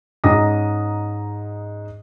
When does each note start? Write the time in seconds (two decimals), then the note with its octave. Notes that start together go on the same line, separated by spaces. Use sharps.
0.24 G#2 C#4 D#5 A#5 D#6 A#6